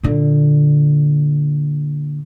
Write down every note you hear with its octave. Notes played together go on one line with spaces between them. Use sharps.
A#2 D3